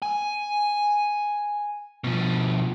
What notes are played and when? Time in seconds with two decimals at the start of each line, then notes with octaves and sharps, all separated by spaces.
0.02 G#5
2.04 B2 F3